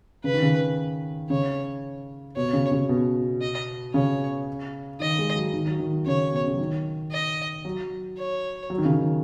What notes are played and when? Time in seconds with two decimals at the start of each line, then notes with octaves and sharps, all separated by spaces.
0.24 C#3 B4
0.34 D#3
0.42 C#3
1.30 C#3 C#5
2.36 B2 C#5
2.53 C#3
2.72 C#3
2.89 B2
3.41 D#5
3.94 C#3 C#5
5.00 D#3 D#5
5.18 G#3
5.36 F#3
5.53 D#3
5.66 F#3
5.79 D#3
6.06 C#3 C#5
6.32 B2
6.46 C#3
6.53 F#3
6.60 D#3
7.12 D#5
7.65 F#3
8.17 C#5
8.70 F#3
8.78 D#3
8.85 C#3
8.93 D#3